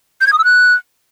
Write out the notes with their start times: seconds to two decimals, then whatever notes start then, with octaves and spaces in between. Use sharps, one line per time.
0.21 G6
0.27 G#6
0.33 D#6
0.39 E6
0.44 F#6